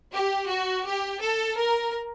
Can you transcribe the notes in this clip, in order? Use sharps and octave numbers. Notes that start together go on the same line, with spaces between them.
G4
F#4
G4
A4
A#4